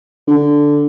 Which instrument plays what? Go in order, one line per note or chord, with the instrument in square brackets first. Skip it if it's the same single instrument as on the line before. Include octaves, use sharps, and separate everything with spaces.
[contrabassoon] D3